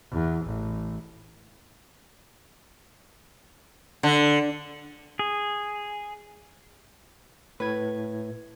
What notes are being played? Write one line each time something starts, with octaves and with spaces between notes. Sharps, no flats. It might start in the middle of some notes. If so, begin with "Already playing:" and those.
E2
A1
D3
G#4
A2 B4 G#6